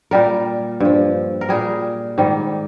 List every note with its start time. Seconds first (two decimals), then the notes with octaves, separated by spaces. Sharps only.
0.11 A#2 G3 A#4
0.80 G2 F3
1.41 A#4
1.49 A#2 G3 G#4
2.18 G#2 D#3 G3